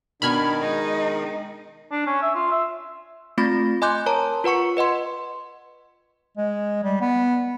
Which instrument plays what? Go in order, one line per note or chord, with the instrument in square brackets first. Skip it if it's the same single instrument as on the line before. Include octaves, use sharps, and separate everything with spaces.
[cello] B2 [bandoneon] D#3 [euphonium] D4 [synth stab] B5 F6 G#6
[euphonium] G#3 [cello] D#4
[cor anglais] D4
C#4
E5
F4
E5
[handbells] A3 C4 F4 B5 A6 A#6
D#5 G#5 C6 D6 F#6 G6
A#4 C#5 A5 A#5
F4 B4 F#5 C#6 C#7
B4 D#5 F#5 C6
[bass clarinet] G#3
G3
B3